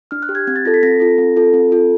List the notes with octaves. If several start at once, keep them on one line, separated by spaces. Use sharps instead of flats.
D4 F6
F#6
G4
G#6
C4 G#6
A6
F4 A4 A#6
B6
C4 A#6
F4 A4
C4
F4 A4
C4
F4 A4